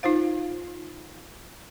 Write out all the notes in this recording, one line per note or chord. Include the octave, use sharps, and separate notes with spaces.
D#4 F4 C5 F5